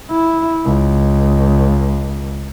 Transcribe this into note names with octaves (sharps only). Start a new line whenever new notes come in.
E4
C#2